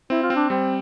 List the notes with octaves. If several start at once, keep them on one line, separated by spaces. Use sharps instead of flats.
C4 E4
F4
C4
D4
G3 C4